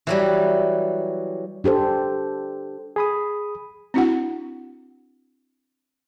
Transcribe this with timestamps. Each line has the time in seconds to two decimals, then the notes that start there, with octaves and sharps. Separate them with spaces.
0.07 E3 F#3 G3
1.64 D4 G4 A4 C5
2.96 G#4 B5 D#6
3.94 C4 D4 E4 F#4 F#5